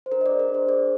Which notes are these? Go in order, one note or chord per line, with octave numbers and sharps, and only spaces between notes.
C5
D4 A#4
D#5
G#4 D5
A#4
D4
C5
G#4 D5